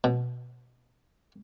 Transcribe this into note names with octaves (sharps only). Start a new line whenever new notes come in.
B2